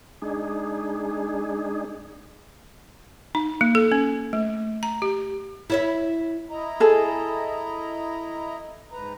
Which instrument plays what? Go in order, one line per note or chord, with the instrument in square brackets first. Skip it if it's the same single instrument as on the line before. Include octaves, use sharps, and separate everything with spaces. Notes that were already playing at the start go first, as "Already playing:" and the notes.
[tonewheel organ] G#3 D4 D#4 G#4
[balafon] D#4
A#3
A4
C#4
A3
A#5
G4
[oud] E4 C#5 E5
[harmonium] E4 D#5 A#5
[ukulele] G#4 A4
[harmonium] G#2 B4 A#5